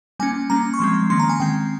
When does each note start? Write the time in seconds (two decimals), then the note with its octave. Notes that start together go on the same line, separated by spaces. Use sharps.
0.19 G3 A#3 C#4 G#5
0.50 G3 A#3 C#4 A#5
0.74 C#6
0.79 F3 G#3 C4 C6
1.10 D#3 A#3 C#4 C6
1.20 A#5
1.29 G#5
1.40 D#3 G#3 C4 G5